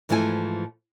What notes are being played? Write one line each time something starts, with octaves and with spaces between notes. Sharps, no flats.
G#2 E3 F3 A3 E4 G#5